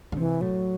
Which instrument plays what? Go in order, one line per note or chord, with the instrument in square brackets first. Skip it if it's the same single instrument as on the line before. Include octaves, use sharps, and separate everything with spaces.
[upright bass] D3
[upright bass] C3 [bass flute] E3
[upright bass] A2 [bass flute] F#3